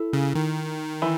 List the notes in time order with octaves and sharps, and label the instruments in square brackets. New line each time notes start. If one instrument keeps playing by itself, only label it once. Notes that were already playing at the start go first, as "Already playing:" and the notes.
Already playing: [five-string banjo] E4 A4
[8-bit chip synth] C#3
D#3
[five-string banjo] E3